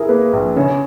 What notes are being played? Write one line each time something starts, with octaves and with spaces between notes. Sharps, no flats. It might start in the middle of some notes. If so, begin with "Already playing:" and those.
Already playing: E4 G#4 A#4
A#3 B4
A#1
C#3 C#5